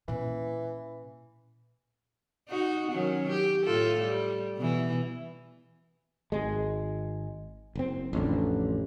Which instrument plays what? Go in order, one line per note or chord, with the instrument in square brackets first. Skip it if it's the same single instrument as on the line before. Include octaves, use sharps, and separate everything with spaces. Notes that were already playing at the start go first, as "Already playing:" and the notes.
[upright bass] A#2 C#4 [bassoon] E3
[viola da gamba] D#4 F#4
D#3 F#3 C#4
G4
A2 F4 A4
G3
B2 E3
[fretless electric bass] G#1 G#3
F#1 C4
A1 F2 D3